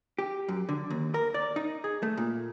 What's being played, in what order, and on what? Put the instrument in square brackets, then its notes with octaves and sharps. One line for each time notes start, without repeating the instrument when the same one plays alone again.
[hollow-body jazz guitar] G4
F#2
D3
D#2
A#4
D5
D#4
G#4
A3
A#2